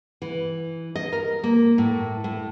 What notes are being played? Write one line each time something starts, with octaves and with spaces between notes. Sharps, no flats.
E3
D#5
A#4
A#3
A2
A2